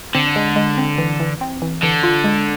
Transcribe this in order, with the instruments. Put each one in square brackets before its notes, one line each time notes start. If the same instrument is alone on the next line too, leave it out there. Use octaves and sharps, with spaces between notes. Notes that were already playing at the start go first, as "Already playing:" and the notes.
[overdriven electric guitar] D3 [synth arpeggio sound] C4
[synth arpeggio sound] G#3
G#3
C4
E3
E3
C4
E3
[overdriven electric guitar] D3 [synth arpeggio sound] E3
[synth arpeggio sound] F4
G#3